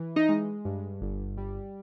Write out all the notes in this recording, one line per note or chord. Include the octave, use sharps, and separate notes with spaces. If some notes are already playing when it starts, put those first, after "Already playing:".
Already playing: E3
D#4 D#5
G#3
G2
G1
G3